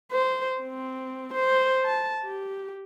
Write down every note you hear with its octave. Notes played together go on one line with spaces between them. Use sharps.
C5
C4
C5
A5
G4